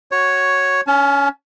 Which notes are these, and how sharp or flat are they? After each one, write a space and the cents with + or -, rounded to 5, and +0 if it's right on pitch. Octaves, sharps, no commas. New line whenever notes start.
F#4 +0 C#5 +0
C#4 +15 A5 -40